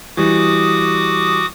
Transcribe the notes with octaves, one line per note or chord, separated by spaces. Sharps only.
E3 G3 F#4 D6 D#6